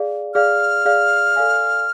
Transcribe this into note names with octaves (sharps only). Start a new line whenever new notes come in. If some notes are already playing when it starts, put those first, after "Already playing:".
Already playing: G#4 D5 F5
G#4 D5 F5 F6
G#4 D5 F5
A4 D5 F5 G#5